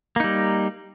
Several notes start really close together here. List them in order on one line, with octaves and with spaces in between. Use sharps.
A#3 D#4 G3